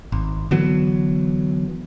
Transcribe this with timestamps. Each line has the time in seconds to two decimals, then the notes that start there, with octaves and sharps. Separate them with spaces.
0.12 G#1
0.51 D3 E3 F#3 B3